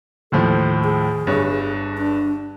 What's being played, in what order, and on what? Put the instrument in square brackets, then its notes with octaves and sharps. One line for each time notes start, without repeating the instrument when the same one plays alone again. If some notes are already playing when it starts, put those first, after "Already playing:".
[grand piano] D#2 A2 F3 [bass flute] A4
[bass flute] G#4
[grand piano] G1 G2 C#5
[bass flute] D4